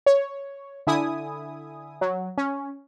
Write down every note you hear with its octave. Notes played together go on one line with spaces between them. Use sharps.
C#5
D3 E4 G#5 D#6
F#3
C#4